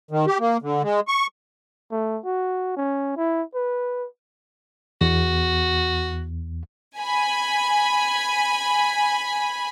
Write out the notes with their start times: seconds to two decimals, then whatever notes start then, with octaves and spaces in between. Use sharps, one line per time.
0.11 D#3
0.27 G4
0.40 A#3
0.62 D3
0.82 G#3
1.08 C#6
1.92 A3
2.24 F#4
2.76 C#4
3.17 E4
3.54 B4
5.01 E2 F#4
6.99 G#5 B5